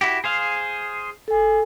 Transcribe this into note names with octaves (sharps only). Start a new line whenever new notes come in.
E4 F#4 G4
G#4 C5 F5
A4 G#5